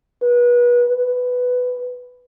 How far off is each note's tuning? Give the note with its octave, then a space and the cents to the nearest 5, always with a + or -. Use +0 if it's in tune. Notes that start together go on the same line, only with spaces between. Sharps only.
B4 -30
B4 +10